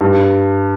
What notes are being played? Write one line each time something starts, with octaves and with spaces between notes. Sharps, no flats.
G2